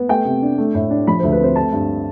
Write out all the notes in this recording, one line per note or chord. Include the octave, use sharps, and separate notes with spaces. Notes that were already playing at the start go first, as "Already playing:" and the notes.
Already playing: B3
A3 G5
C3
D4
A3
A2
D4
F3 B5
D2 C5
B4
C4 C5
A3 A5
G2